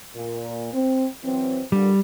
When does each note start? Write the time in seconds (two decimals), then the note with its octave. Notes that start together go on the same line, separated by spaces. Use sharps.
0.15 A#2
0.73 C4
1.24 E3 F#3 C4
1.72 A#2 D3 G3